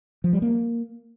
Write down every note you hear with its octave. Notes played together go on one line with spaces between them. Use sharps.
F3
G3
A#3